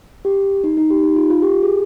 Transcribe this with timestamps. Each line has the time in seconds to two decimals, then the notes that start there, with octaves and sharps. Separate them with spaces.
0.25 G4
0.64 D#4
0.77 D#4
0.90 G4
1.03 D#4
1.16 F4
1.30 F4
1.42 G4
1.63 G#4